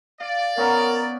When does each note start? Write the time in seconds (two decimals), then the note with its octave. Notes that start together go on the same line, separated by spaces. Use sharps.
0.20 D5 F5
0.57 B3 C#4 A#4 A#5